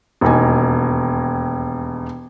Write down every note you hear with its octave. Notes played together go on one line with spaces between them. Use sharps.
E1 D#2 D#4 G#5